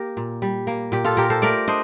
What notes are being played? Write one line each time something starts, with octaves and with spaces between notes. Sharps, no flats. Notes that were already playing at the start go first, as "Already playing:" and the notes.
Already playing: A#3 G4 A#4
A#2
G3
A#3
A#2 G4
F4 A4
A#2 G4 A#4
A4 C5
A3 A#4 D5
D4 C5 D#5